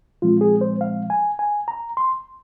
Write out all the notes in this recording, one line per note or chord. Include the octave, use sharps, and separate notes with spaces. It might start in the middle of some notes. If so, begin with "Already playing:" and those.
A#2 F3 G#3 C4 F4
G#4
C5
F5
G#5
G#5
A#5
C6